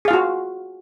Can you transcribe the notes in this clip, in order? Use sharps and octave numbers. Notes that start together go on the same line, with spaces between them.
F4 F#4 G#4 F5